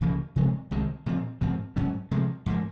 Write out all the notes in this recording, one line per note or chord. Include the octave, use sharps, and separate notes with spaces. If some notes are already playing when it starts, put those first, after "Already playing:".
C#2 C#3 F3 A#3
C3 F3 G#3 C4
C2 C3 D#3 G#3
A#2 F3 C4
G#2 F3 C4
G#2 F#3 C#4
C3 F3 G#3
G#2 F3 A#3